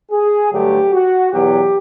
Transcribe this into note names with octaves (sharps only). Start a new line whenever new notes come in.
G#4
G2 D3 F#3 A3 G4
F#4
E2 B2 F#3 G4